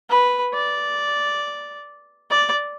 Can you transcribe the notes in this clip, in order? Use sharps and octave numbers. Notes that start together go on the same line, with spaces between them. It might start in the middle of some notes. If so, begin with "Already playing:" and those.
B4
D5
D5